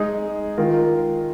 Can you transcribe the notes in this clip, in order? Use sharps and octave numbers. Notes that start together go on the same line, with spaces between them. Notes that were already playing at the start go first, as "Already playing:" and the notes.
Already playing: G#3 D#4 G#4 D#5
D#3 G#3 F4 A#4